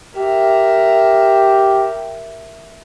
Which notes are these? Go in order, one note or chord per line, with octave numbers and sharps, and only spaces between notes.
G4 A#4 E5